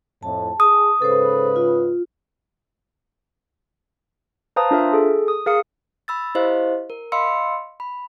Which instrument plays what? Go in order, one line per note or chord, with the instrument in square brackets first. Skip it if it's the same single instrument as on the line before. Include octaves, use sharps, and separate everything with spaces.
[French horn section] F2 A2 [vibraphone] A5
[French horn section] G#4 [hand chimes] D#6
[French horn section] G#2 C#3 B4 [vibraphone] A4 C5
[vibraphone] F4
[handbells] B4 C5 F5 A5 A#5 D#6
D4 F4 A#4 E5
G#4 A4
D#6
G#4 A#4 F5 D#6 C#7
[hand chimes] B5 E6 A6
E4 G4 C5 D#5 F5
A#4
D#5 F5 B5 C6 E6 C#7
B5